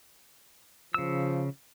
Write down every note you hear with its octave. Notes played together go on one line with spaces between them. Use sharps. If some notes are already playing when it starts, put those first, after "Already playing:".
C#3 F3 E6